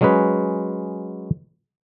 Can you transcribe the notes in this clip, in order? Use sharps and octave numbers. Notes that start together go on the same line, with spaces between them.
F#3 G#3 C#4 G#4 B4